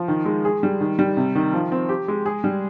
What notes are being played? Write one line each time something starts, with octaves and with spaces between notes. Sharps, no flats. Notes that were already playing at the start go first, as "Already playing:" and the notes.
Already playing: F3
D#3
G#3
G#4
G3
D#3
G3
C3
D#3
F3
C4
G4
G#3
G#4
G3